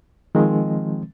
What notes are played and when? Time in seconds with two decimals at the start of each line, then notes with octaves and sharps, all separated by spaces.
0.35 D#3 F3 G#3 C4